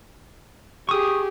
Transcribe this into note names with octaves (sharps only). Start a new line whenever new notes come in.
G4 G#4 C#6 D#6